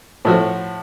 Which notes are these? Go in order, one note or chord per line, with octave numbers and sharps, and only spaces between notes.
A2 F3 F#4